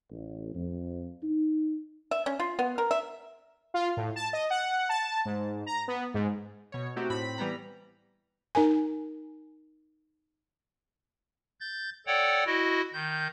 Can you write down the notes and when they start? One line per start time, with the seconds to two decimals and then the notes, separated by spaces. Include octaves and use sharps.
0.10 A1
0.54 F2
1.22 D#4
2.11 E5
2.26 C#4
2.40 F4
2.59 B3
2.78 A#4
2.91 E5
3.74 F4
3.97 A2
4.16 A5
4.33 D#5
4.50 F#5
4.89 A5
5.25 G#2
5.66 A#5
5.88 B3
6.14 G#2
6.72 B2 C#5
6.96 A3 C4 D#4 F#4 G4
7.10 A2 C4 B5 B6
7.38 E3 G3 B3 A#5
8.55 D#4 A#4 G#5
11.60 G6 A6
12.07 A4 C#5 D5 F#5 G5
12.46 E4 F#4 D#5
12.93 D#3 G6